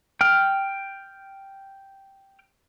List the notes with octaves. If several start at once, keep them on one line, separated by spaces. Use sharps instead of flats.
G5 F6